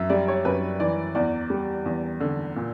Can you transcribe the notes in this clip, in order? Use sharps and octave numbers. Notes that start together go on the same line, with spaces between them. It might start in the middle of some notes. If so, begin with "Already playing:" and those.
Already playing: F#2 E5
G3 D5
C#5
F#2 B4
E3 D5
E2 D5
G3
E2
D3
A#2